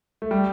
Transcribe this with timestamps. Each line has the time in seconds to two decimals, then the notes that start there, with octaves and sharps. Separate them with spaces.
0.22 A3
0.31 G3